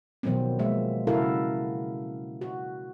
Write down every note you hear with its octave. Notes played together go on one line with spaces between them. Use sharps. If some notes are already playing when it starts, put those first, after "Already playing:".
B2 D#3 F3 F#3 B3 C4
F3 G#3 A#3 E5
C#3 E4 F#4 A4 A#4 F5
F#4